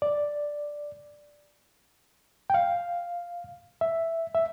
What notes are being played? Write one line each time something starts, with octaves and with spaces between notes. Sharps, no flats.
D5
G5
F5
E5
E5